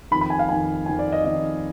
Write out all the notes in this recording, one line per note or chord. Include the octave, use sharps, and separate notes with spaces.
F2 D#3 B5
B5
G#5
F5
F2 D#3 G#5
F2 D#3 G#5
D5
D#5
F2 D#3 D#5